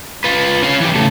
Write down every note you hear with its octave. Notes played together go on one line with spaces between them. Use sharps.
F4 B4
C#4 F5
E3 G4
C#3 A3